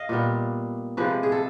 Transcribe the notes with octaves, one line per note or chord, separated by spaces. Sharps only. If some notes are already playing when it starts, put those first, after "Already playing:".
Already playing: D#5 F5
A#2 G3 B3
C3 F3 G#3 B4
G#4
A4